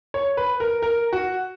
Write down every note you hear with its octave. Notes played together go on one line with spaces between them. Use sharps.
C#5
B4
A#4
A#4
F#4